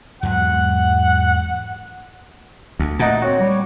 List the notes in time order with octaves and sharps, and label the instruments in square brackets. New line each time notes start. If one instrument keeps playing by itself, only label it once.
[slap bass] E2 G#2 F#3 [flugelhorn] F#5
[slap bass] D2
[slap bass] A#2 [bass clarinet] A3 [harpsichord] D#4 A5 [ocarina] F#5
[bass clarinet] C4 [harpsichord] F#4 [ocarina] C#5
[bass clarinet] G3